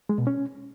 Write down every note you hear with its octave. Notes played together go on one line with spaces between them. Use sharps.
G#3
B2
C#4